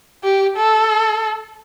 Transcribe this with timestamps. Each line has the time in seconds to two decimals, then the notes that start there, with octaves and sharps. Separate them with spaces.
0.23 G4
0.56 A4